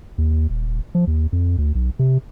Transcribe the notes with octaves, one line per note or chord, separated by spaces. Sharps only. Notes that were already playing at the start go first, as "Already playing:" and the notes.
D#2
D#1
F3
D#2
F2
D2
B1
C3